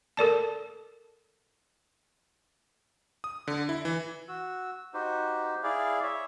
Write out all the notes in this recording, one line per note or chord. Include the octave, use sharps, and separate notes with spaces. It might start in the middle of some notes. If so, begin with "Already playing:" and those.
A4 A#4 D5 A5
D#6
D3
E4
E3
F#4 E6
D#4 F#4 G4 C5
E4 G#4 D5 F5
C#5 E5